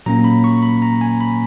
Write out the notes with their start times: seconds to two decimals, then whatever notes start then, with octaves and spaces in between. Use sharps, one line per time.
0.06 A#2 F#3 A#3 C#4 A#5
0.24 B5
0.44 C#6
0.63 B5
0.82 A#5
1.01 G#5
1.21 B5